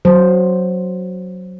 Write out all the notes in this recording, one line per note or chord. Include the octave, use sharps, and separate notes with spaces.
F#3 C5